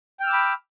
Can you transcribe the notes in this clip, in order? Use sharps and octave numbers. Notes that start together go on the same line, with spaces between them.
G5 B5 D6 E6 F6